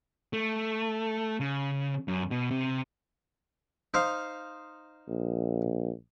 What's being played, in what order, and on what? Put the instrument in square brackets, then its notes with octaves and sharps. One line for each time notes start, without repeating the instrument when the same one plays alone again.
[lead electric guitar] A3
C#3
F#2
B2
C3
[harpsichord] D#4 C5 F5
[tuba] A#1